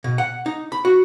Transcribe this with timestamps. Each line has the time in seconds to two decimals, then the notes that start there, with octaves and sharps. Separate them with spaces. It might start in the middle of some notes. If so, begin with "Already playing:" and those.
0.04 B2
0.18 F#5
0.46 D#4
0.72 B5
0.85 F#4